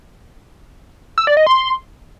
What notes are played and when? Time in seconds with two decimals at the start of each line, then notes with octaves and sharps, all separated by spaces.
1.18 E6
1.27 D5
1.37 D#5
1.46 C6